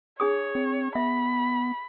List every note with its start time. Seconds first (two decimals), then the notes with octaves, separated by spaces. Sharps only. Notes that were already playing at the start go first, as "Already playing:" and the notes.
0.20 D4 G#4 C#5 D#6
0.55 C4
0.95 B3 E5 B5